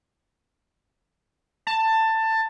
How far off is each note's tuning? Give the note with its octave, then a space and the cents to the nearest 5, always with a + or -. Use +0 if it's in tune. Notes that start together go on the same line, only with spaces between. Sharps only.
A5 +15